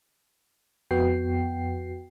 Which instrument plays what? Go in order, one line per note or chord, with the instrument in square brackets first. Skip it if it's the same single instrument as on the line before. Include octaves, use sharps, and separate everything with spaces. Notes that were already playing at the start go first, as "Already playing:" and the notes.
[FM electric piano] F2 B3 F#4 G5 C7